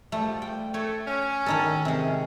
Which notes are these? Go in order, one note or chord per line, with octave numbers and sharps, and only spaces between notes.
F3 G3 A3
G5
A3 C#5
C#4
D#3 D#4 A4
C3 G#3